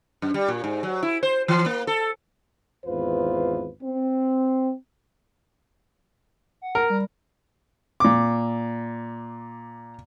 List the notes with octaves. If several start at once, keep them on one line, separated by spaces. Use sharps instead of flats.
F#2
G3
A#2
G#2
F#3
E4
C5
E3
A#3
A4
G#1 E2 F4 B4 C5
C4
F#5
A#4
G3
A#2 D6